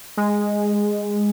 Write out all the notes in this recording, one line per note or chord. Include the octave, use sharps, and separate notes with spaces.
G#3